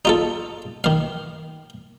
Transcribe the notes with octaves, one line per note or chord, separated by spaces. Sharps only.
D#4 F4 A4
D#3 F5